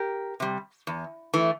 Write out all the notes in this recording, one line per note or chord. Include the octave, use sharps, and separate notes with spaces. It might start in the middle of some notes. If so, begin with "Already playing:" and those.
Already playing: G4 A#4
C3 G3
E2
E3 A3